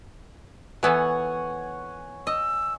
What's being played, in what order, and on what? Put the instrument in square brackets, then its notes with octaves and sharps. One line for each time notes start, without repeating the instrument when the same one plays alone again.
[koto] E3 B3 A4 [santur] C#5 F#5 G#5
[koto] D#5 [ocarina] E6